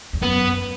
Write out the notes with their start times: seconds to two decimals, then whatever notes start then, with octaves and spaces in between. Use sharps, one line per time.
0.13 E2
0.22 F#2 B3